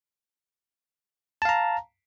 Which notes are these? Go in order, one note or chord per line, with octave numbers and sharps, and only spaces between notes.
F5 A5 A#5